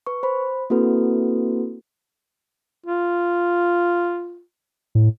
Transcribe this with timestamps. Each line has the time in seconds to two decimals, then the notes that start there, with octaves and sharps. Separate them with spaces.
0.06 B4 C#6
0.23 C5 B5
0.70 A#3 C4 E4 F#4 A4 B4
2.86 F4
4.95 A2